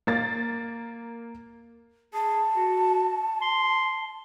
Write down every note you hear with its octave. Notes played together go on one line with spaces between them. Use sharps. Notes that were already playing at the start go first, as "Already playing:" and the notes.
A#3 A6
G#4 A5
F#4
C6